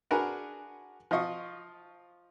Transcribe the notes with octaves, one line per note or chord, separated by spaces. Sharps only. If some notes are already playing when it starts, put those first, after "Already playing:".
D4 F#4 G#4 A#4 B4
F3 F4 D#5 C#6